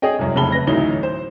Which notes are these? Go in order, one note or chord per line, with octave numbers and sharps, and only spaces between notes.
G#4 C#5 D#5 G5
C2 F#2
F1 C#3 E3 A5 B5 G7
B4 A#6
A1 D2 E3 F#3 D#4 G7
C5